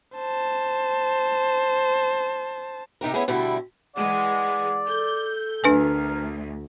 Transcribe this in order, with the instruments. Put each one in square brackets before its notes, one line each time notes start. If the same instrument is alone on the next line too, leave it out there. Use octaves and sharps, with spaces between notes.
[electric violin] C5 A5
[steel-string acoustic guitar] C3 D#4 G4 A#4
A3 B3 C#4 E4 G#4
B2 D3 G3 A3 E4
[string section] E3 G#3 [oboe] D5 [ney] F#5
[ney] A4 [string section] G6
[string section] D2 [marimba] D4 B4 G#5 [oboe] A#4